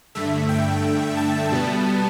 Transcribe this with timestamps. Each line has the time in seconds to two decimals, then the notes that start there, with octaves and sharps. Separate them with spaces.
0.15 G2 D3 A3 E5
0.49 G5
1.17 A5
1.52 B2 G3 B3